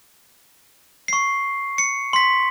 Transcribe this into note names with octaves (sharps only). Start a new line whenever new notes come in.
C#6 C7
C#7
C6 B6